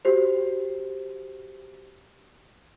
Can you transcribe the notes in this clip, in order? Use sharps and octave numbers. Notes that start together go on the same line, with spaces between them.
F#4 G4 C5